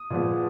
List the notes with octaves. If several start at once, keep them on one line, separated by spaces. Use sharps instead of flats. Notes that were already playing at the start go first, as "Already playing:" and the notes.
Already playing: D#6
A#2 F3 G#3 B3